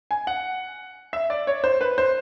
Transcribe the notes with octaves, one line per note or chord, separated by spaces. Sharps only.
G#5
F#5
E5
D5
C#5
C5
B4
C5